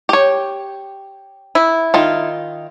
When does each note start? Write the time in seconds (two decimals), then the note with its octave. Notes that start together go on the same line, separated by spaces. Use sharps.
0.09 G4 C#5
1.55 E4
1.94 D#3 F4